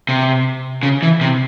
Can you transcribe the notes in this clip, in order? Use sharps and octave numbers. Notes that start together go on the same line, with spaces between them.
C3
C#3
E3
C3